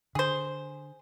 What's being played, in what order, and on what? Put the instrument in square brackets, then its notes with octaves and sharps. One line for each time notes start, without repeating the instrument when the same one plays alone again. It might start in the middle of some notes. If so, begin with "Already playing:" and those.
[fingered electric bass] D3 [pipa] G#4 C5